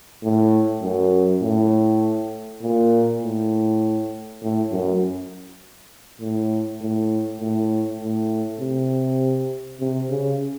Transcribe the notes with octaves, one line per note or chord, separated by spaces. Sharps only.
A2
F#2
A2
A#2
A2
A2
F#2
A2
A2
A2
A2
C3
C3
C#3